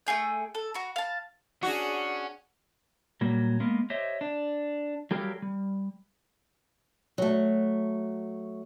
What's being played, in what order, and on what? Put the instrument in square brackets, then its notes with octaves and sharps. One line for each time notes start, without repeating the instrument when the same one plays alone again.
[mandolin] A3 A#3 G#4 G5
A4
F#4 A#5
F5 A5
[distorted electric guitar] C#4 [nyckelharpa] D4 G#4 [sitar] F#4
[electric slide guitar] A#2 F#3 G3 A#3
G#3 A#3 B3
G4 C5 C#5 D#5 E5
D4
F#3 G3 G4 A4 A#4 F5
G3
[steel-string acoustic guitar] F#3 A3